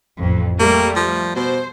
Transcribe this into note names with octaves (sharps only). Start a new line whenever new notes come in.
A1 F2
G3 A3 A#3
F3
B2 C5